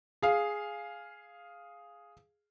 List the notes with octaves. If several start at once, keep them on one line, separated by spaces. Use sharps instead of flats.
G#4 F5